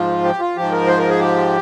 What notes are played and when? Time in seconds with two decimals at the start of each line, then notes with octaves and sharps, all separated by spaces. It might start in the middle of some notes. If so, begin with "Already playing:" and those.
Already playing: G#2 F3 F4
0.24 G4
0.40 F4
0.56 G#2 F3 G4
0.72 A#4
0.87 C5
0.98 A#4
1.09 G#4
1.20 G4